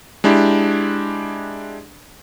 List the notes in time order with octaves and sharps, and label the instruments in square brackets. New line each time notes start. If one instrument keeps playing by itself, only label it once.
[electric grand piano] G#3 D4 E4 G4